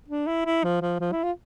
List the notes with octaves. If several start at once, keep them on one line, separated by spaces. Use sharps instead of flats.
D4
E4
E4
F3
F3
F3
E4
F4